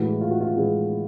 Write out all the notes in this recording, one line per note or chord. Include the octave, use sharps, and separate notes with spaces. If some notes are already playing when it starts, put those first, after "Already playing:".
Already playing: A2 E3 G#3 F#4
F4
F#4
F4
A2 E3 G#3 G#4